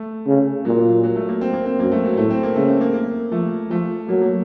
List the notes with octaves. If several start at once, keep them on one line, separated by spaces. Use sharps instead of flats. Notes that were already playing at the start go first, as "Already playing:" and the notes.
Already playing: A3
C#3
A#2 F#3
F#3
A3
A#3
C4
A#3
C4
F#2 A#3
A3
F#3
A2 A3
C4
A#3
C#3 A3
A3
A#3
A#3
F3 A3
F3 A3
F#3 A#3
A#3